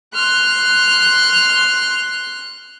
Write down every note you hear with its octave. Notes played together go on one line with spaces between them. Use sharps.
C6 F6 F#6